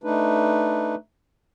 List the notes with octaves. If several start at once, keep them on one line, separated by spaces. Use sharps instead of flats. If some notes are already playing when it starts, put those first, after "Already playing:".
A3 D4 D#4 B4